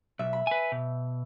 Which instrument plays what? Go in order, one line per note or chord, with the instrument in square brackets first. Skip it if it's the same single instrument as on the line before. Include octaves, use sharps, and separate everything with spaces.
[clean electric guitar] B1 [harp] E5
[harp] B5
[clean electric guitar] B4 G#5
B2